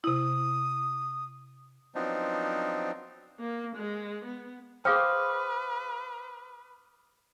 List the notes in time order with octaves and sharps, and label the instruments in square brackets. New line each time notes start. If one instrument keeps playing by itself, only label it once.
[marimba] C3 E4 [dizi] D#6
[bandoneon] F3 F#3 B3 C4 D4 D#4
[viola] A#3
G#3
B3
[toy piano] G#4 F5 G5 [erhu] B4 [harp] C5 [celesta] D6 D#6 F6